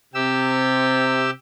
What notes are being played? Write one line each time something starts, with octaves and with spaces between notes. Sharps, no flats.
C3 G4 E6